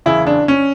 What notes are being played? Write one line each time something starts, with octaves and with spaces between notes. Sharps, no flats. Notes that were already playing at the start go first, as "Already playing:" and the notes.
F#1 E2 C#3 E4
D4
C#4